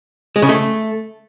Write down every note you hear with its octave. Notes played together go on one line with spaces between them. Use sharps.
G#3
C#3
A3